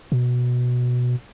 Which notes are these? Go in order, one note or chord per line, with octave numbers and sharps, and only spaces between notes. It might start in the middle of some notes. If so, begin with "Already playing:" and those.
B2